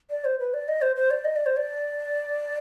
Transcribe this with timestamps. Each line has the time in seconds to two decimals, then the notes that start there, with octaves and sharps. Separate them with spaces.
0.10 D5
0.25 C5
0.40 B4
0.54 D5
0.68 D#5
0.82 C5
0.96 C5
1.11 D5
1.24 D#5
1.36 D5
1.46 C5
1.56 D5